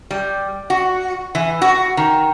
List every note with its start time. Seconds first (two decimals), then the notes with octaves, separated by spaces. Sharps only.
0.11 G3
0.70 F#4
1.35 E3
1.62 F#4
1.97 D#3